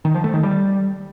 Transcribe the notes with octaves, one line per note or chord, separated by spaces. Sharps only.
D#3
F3
A3
D#3
G3